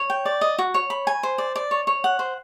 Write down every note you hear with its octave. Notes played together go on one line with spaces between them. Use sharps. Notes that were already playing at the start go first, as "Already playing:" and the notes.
Already playing: C#5
G5
D5
D#5
F#4
C#5
B5
G#5
C5
D5
D5
C#5
C#5
F#5
C5